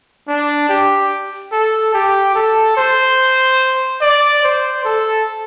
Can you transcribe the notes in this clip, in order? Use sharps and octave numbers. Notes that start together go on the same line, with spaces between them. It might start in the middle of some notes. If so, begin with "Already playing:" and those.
D4
G4
A4
G4
A4
C5
D5
C5
A4